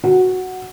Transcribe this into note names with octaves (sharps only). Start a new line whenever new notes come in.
F#4